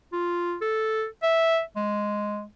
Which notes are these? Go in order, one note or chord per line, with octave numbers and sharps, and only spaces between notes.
F4
A4
E5
G#3